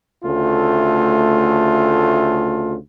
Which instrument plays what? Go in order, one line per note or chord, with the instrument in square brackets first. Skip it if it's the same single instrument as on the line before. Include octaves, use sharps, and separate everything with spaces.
[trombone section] D2 C#3 A3 F4